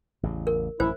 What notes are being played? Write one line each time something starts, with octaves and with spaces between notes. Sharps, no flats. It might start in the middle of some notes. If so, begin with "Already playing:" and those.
A1 E2 C#3
A#4
A1 F#2 E4 C5